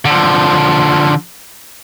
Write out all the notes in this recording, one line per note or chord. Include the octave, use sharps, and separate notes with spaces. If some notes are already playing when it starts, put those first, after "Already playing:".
D3 F3